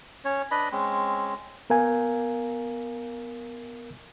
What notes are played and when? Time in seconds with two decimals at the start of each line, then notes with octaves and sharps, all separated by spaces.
0.25 C#4 C#5
0.51 D4 B4 D#5 B5
0.72 G#3 C4 C#4
1.70 B3 A#4 F5 G#5